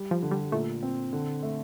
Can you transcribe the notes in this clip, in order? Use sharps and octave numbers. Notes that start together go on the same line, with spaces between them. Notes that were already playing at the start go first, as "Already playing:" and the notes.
Already playing: G3
F3
D3
G3
A#2 A3
C4
D3
A3